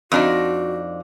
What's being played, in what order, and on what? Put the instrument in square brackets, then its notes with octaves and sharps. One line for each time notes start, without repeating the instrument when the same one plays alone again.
[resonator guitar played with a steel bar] F2 D4 D#4 [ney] F#4